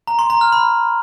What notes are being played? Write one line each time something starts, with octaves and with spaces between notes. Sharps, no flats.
A#5
C6
A#5
F6
B5